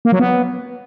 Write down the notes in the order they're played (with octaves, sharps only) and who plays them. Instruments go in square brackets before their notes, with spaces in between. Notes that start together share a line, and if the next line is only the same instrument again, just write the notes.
[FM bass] A#3
F#3
B3